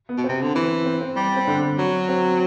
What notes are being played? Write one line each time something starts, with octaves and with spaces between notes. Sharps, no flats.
B3
B2
C4
C3
D3
E3 C4
C4
C4
G3
C4
D3 D4
F#3
C4